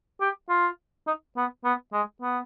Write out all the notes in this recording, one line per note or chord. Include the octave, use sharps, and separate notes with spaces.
G4
F4
D#4
B3
B3
G#3
B3